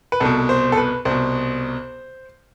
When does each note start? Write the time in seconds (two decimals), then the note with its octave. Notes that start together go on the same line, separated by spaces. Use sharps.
0.12 B4
0.20 C2 B2 A4
0.49 C5
0.72 A4
0.77 B4
1.05 C2 C5
1.10 B2